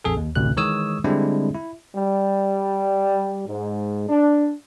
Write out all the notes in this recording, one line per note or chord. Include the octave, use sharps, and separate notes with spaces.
A#1 F2 G#4 A4
D#2
A1 D2 C3 F#6
D#3 E3 G#3 C#5 D#6 E6
D3 G3 G#3 C4 D4 E4
E4
G3
G#2
D4